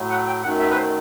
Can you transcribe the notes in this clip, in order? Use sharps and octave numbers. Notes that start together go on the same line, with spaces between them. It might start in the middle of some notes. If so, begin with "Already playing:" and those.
Already playing: A2 F#3 A3
F#5
G5
F#2 D#3 F#3 A3 F#5
E5
B4
C5